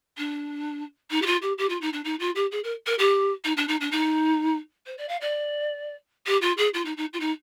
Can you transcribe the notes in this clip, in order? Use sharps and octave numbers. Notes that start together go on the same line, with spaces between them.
D4
D#4
G4
F4
G4
G4
F4
D#4
D4
D#4
F4
G4
G#4
A#4
A#4
G4
D#4
D4
D#4
D4
D#4
C5
D5
F5
D5
G4
F4
G#4
F4
D#4
D#4
F4
D#4